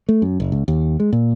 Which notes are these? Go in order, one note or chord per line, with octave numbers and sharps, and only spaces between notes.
A3
F#2
F#1
C#2
D#2
G#3
A#2